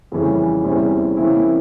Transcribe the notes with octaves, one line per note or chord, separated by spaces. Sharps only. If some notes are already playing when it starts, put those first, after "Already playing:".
F2 C#3 E3 G3 C#4
E2 C3 G3 C#4 E4
C3 E3 A#3 C#4 E4